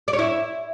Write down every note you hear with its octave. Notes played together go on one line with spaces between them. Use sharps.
D5
C#5
E4